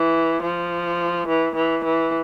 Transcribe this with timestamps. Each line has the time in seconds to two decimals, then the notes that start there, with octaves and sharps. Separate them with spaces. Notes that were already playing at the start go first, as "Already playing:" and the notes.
Already playing: E3
0.42 F3
1.28 E3
1.55 E3
1.84 E3